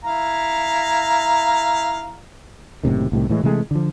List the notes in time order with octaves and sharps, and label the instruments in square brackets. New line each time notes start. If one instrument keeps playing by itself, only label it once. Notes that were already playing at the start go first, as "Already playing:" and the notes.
[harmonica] E4 F5 A#5
[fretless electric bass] F#1 A2 C3 D#3
C2 A2 C3 D#3
A2 E3 G#3
C3 E3 G#3 A3
D3 F3